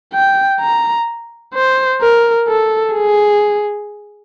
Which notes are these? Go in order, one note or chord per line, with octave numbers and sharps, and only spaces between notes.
G5
A#5
C5
A#4
A4
G#4